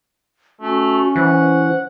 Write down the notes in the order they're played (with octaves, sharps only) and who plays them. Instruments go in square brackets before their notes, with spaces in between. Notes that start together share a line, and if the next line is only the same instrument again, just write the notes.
[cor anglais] A3 [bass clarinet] C#4 [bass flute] F#4
[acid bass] E3 [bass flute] C5 [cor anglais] F#5